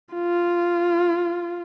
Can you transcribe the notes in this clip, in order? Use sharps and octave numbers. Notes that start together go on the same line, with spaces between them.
F4